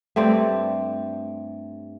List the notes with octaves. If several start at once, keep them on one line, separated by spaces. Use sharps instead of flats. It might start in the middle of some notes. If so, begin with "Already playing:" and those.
G2 A3 C4 D5